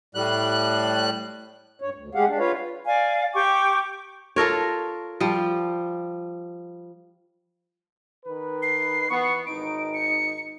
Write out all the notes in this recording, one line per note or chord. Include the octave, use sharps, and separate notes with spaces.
A2 G3 F#6
G2 C#5
D2
G#3 G4 G#4 F5 F#5
D4
F4 B4 C#5 F5
D5 F5 G#5
G4 G5 C#6 D6
F4 A4 A#4 C#5
F3 G3
D#3 B4
C7
E3 B3 C#6
G#1 D#4 D7
C#7